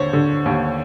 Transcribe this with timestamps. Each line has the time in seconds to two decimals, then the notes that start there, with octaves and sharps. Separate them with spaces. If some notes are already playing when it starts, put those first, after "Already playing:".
Already playing: D#2 D3 C5 C#5
0.13 D3
0.46 D#2